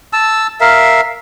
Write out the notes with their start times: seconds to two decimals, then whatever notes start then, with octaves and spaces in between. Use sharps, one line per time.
0.13 A5 E6
0.61 A#4 E5 F5